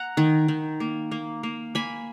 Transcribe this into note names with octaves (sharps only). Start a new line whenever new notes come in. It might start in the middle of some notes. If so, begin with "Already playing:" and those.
Already playing: F#5 A#5
D#3
D#3
A#3
A#3
A#3
A#3 G#5 B5